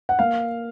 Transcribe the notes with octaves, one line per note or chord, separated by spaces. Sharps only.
F#5
A#3 F5